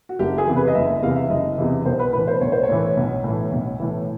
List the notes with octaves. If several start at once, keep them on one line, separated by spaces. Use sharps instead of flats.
F#4
F#1 G4
G#4
E2 C3 E3
B4
D#5
F#1 E5
E2 C3 E3 F5
E5
F#1 D#5
E2 C3 E3
B1 C5
B4
A2 E3 B4
C5
B1 C#5
C5
C#5
A2 E3
B1
A2 E3
B1
A2 E3